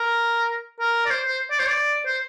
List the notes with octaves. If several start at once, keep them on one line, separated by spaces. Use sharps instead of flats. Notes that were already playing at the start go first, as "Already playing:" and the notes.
Already playing: A#4
A#4
D5
C5
C5
D5
C5
D5
C5